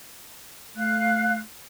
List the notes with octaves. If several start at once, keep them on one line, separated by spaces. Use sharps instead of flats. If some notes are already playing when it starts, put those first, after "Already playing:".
A3 F5 F#6